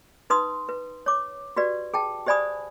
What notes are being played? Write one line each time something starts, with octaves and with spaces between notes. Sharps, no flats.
D#4 B4 C6 D#6
B4
C#5 D6
F#4 G4 B4 D5
G#4 G5 A5
G4 C5 D5 G#5 B5 D#6